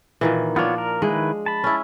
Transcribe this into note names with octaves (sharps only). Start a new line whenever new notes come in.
A#2 D#3 E3
F3 B3 D4 F4 C#5
A#4
D#3 G#3 E4 B4
A5 B5
C#4 E4